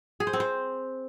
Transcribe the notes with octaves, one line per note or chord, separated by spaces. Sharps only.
G#4
C5
C4
C5